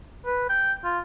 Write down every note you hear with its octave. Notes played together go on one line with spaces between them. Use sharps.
B4
G5
F4